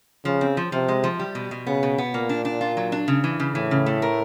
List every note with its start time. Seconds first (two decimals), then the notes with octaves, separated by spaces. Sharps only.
0.25 C#3 F3
0.41 C4
0.57 F3
0.72 C3 F3
0.88 G#3
1.04 F3
1.19 G3
1.35 B2
1.51 B2
1.67 C#3 B3
1.83 B2
1.98 B3
2.14 A#2 A#3
2.29 D4
2.45 D4
2.61 F4
2.77 F#3
2.92 D4
3.08 C#3
3.24 E3
3.40 C#3
3.55 A2 E3
3.71 C#3
3.86 A3
4.02 A#4